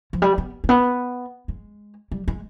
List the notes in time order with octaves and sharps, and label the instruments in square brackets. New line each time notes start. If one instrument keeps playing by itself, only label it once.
[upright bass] F3
G3
B3
G#3
B3
G#3
G3
G#3